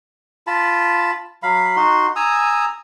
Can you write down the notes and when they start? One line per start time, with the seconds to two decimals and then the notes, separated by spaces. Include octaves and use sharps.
0.47 F4 A5 B5
1.43 F#3 F5 B5
1.76 D#4 F#4 C6
2.16 G#5 A#5 D#6 E6